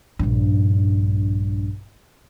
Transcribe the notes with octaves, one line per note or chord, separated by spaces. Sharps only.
A#1 G2